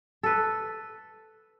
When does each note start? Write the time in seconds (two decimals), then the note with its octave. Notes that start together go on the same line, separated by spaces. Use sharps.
0.23 A4 B4